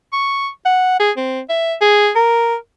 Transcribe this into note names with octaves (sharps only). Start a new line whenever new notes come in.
C#6
F#5
G#4
C4
E5
G#4
A#4